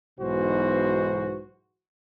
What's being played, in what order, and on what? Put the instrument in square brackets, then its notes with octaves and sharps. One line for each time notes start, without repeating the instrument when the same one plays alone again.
[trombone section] B1 G#2 B2 E3 F#4 C5